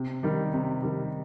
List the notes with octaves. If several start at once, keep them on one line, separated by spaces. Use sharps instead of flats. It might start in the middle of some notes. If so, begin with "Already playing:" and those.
Already playing: C3
D#3 G3
C3
D#3 G3